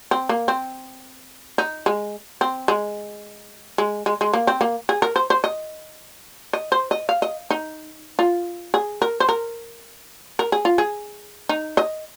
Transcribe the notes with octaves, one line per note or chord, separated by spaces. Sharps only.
C4
A#3
C4
D#4
G#3
C4
G#3
G#3
G#3
G#3
A#3
C4
A#3
G#4
A#4
C5
C5
D#5
D#5
C5
D#5
F5
D#5
D#4
F4
G#4
A#4
C5
A#4
A#4
G#4
F4
G#4
D#4
D#5